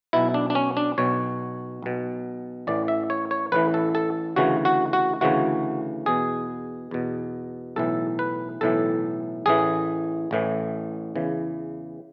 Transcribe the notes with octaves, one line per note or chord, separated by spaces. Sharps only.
B1 B2 E4
D4
D4
C#4
D4
B1 B2 C#5
B1 B2
A1 A2 E3 D5
E5
C#5
C#5
A1 A2 E3 B4
A4
A4
D2 C#3 E3 F#4
F#4
F#4
D2 C#3 E3 F#4
E2 B2 G#4
E2 B2
B1 A2 E3 A4
B4
B1 A2 E3 A4
A1 A2 E3 G#4
A1 A2 E3
E2 C#3 E3